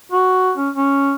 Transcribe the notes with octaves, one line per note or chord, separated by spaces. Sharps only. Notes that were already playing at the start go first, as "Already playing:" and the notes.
F#4
C#4
C#4